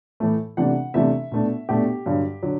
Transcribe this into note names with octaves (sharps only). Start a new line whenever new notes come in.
A2 E3 A3
C3 E3 A3 D4 F#5
C3 E3 A3 D4 E5
B2 A3 D4
B2 A3 D4 G4
G2 D3 F#3
D3 F#3